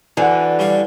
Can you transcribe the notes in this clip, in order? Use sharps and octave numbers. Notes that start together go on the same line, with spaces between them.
D2 D3 E3 F#5 G#5
G3 C#5 F5